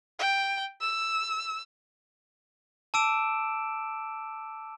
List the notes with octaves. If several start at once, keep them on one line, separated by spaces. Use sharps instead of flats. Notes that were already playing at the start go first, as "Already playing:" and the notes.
G5
E6
A5 D6 E6 D7 E7